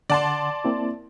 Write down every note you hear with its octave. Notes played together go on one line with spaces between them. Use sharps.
D3 D5 F#5 A5 C6 A6
A#3 C4 E4